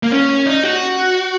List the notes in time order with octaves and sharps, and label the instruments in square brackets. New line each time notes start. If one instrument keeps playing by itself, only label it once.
[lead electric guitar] A#3
C#4
D#4
F#4